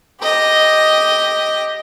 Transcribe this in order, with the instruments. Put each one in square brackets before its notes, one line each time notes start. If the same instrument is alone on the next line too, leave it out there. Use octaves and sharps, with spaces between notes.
[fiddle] G4 D#5